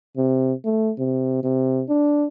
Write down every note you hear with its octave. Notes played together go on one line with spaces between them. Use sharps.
C3
A3
C3
C3
D4